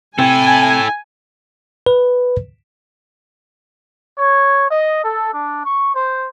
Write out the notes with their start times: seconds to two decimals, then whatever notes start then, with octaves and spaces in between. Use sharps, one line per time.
0.19 C3 E4 A4 G5 G#5
1.86 B4
4.19 C#5
4.71 D#5
5.04 A4
5.34 D4
5.66 C#6
5.95 C5